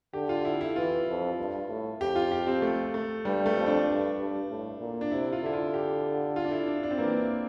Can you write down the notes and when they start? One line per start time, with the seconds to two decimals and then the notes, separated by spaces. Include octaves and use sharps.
0.13 D3 G4
0.29 F4
0.45 E4
0.61 E4
0.76 E3 F4
1.08 F2
1.38 G2
1.69 A2
2.01 F2 G4
2.16 F4
2.32 G4
2.47 C4
2.62 A3
2.94 A3
3.25 G2 G3
3.46 A3
3.57 F2
3.66 D4
3.87 G2
4.19 G2
4.49 A2
4.80 A#2
5.01 D4
5.11 C3 E4
5.33 F4
5.43 D3 E4
5.53 F4
5.74 G4
6.36 F4
6.45 D4
6.52 E4
6.67 D4
6.83 D4
6.91 C4
6.98 E3 A#3